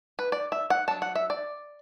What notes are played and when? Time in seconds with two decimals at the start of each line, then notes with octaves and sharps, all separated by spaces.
0.19 B4
0.32 D5
0.52 E5
0.70 F#5
0.88 F#3 D4 A5
1.02 F#5
1.15 E5
1.30 D5